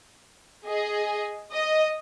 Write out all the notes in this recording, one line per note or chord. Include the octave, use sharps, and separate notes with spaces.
G#4 D#5
D#5